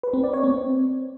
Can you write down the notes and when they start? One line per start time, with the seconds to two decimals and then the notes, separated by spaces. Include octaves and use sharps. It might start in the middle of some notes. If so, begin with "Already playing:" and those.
0.03 B4
0.13 C4
0.23 D5
0.33 C#5
0.44 C4